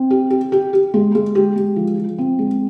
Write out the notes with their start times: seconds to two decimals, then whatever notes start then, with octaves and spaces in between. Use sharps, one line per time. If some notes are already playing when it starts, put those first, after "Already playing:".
Already playing: C4
0.10 G4
0.30 G4
0.52 G4
0.73 G4
0.94 G#3
1.15 G#3
1.35 G4
1.56 G#3
1.76 F3
1.98 F3
2.18 C4
2.39 G#3